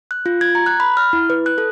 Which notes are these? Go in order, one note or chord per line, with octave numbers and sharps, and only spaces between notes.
F#6
F4
G#6
A#5
F#6
B5
F6
E4
B4
F#6
A4